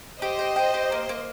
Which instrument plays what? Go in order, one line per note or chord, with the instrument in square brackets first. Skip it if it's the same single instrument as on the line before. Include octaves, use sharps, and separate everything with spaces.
[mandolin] G4 [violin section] C5 D#5
[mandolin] G5
G5
G4
A#3
A#3